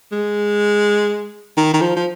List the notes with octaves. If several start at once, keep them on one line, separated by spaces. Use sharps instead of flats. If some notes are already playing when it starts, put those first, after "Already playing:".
G#3
D#3
D#3
F3
F3